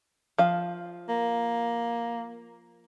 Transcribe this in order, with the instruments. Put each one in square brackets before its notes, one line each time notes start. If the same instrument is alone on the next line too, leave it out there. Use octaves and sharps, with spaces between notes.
[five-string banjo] F3 F5
[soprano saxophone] A#3